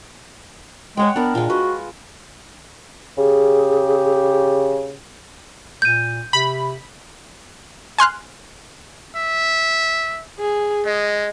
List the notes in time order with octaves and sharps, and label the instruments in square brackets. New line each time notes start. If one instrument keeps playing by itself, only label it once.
[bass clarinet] G#3 [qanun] C#5 F#5 G5
[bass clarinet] B3 [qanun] D4 A#4
[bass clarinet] A#2 [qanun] G#3 F4
[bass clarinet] F#4 [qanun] B4 D#5
[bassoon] C#3 [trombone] G4 [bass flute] G#4
[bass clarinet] A#2 [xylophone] G6 D#7
[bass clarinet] C3 [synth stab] B5
[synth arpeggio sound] G#5 C6 F6 F#6
[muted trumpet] E5
[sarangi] G#4
[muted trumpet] G#3 [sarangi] D#5